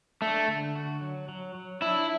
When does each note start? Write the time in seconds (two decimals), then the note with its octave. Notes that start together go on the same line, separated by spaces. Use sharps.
0.22 A3 D4
0.48 D3
0.75 F#4
1.01 F#3
1.29 F#3
1.55 F#3
1.81 D4 E4